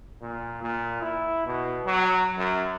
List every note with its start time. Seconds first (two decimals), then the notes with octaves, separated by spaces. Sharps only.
0.21 A#2
0.62 A#2
1.02 E4
1.46 B2
1.85 F#3
2.37 F#2